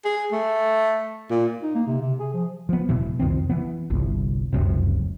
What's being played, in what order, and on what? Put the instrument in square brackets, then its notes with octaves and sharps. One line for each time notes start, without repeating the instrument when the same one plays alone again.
[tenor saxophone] G#4
A3
A#2
[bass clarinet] D#4
A#3
C3
C3
G#4
F3
[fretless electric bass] F3 B3
E1 F#2 B2 E3
C2 F2 D#3 C4
E3 B3
G1 C2
F1 C#2 F#2 C3